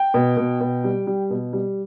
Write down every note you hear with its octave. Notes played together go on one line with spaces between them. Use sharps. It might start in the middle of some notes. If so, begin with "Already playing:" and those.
Already playing: G5
B2
B2
B2
G3
G3
B2
G3